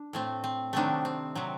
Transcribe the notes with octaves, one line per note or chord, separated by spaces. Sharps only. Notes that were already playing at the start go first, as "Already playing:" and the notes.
Already playing: D4
A2 A3 C4
C4
C3 D#3 F#3 A3 C4 D4
C4
C3 F#3 C4